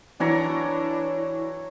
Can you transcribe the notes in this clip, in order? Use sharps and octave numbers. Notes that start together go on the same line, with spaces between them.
E3 F#3 D4 E4 C#5 A#5